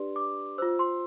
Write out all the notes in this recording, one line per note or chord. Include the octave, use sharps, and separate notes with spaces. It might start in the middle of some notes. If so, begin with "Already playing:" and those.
Already playing: D4 G4 B4 D5 C6
D6
F4 C5 E6
C6